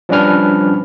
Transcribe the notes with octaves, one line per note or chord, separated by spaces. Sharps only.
F3 G3 C#4 D4 B4 F6